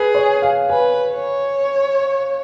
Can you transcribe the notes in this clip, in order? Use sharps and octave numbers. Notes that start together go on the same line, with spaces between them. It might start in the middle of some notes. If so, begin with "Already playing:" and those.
Already playing: G#4 B4
C#5
F5
B4 G#5
C#5